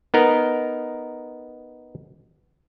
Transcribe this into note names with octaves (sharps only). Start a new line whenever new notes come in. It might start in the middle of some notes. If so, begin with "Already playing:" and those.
B3 D#4 A#4